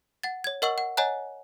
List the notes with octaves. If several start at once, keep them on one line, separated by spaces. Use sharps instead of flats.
F#5 A6
C#5 G#6
A#4 D#5 F#5 C#6 E6 F#7
F#5
C#5 D#5 F#5 G#5 A#5 F#6